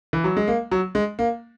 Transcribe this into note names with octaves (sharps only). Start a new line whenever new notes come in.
E3
F#3
G#3
A#3
F#3
G#3
A#3